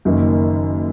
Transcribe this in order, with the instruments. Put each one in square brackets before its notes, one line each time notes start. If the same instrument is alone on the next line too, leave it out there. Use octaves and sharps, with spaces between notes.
[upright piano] F#1 F#2 D#3 A#3